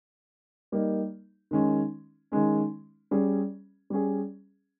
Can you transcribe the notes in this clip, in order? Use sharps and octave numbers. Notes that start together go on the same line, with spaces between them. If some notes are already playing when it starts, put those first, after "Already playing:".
G3 A#3 D#4
D#3 G#3 C#4
D#3 G#3 C#4
G3 C#4 G#4
G3 C#4 G#4